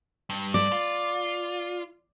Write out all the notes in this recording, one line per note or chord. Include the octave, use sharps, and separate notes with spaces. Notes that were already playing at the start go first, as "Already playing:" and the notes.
G2
D5
F4